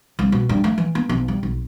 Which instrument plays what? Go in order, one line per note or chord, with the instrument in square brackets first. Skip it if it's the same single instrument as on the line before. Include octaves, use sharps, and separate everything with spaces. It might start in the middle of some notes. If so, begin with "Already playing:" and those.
[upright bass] C2
B2
G2
A3
E3
B3
B1
G3
B1